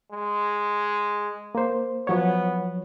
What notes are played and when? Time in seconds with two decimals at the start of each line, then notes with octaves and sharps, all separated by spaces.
0.12 G#3
1.55 A#3 C5
2.07 F3 F#3 B3 C#5